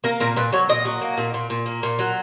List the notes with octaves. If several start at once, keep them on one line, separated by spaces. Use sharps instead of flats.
A#3 A#4
A#2 A#4
A#2 B4
F#3 C#5
A#2 D#5
F#3
A#3
A#2
A#2
A#2
A#3
A#2
F#3